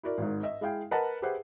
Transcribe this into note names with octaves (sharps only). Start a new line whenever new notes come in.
E4 F#4 A#4 D5
G#1 G#2
D#5 E5
G#3 E4 G#4 F5 G5
A#4 B4 D#5 F#5 A5 A#5
G4 G#4 B4 C5 E5 F#5